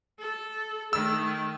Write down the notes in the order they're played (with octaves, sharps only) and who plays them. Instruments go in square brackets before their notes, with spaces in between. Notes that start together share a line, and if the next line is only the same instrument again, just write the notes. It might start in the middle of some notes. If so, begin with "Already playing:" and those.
[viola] A4
[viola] D#3 A3 [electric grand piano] E6